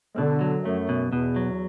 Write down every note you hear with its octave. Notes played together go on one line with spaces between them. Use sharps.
B2 D3
F#3
F#2 A3
B2
E2 B2
F#3